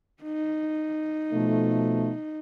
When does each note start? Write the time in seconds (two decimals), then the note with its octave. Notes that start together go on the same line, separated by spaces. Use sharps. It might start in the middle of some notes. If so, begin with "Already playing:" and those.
0.23 D#4
1.33 B2 F3 A3